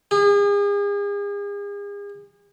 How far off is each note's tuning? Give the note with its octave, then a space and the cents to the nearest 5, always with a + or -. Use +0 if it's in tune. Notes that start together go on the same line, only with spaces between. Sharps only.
G#4 -40